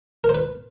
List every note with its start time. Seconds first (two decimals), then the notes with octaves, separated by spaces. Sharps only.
0.24 A#4
0.29 C5
0.35 B4